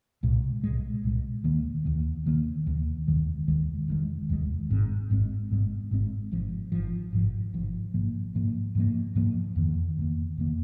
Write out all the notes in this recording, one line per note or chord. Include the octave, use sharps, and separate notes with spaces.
C2 A#2 G#3
C2 A#2 G#3
C2 A#2 G#3
D#2 D#3 A#3
D#2 D#3 A#3
D#2 D#3 A#3
D#2 D#3 A#3
F1 D#2 D#3 G#3
F1 D#2 D#3 G#3
F1 D#2 D#3 G#3
F1 D#2 D#3 G#3
G#1 G#2 G#3 C4
G#1 G#2 G#3 C4
G#1 G#2 G#3 C4
G#1 G#2 G#3 C4
G#1 G#2 F3
G#1 G#2 F3
G#1 G#2 F3
G#1 G#2 F3
G#2 F3 A#3
G#2 F3 A#3
G#2 F3 A#3
G#2 F3 A#3
F2 D#3 A#3
F2 D#3 A#3
F2 D#3 A#3